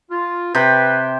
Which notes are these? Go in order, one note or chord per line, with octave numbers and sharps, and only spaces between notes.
F4
C3 B4 C5 G5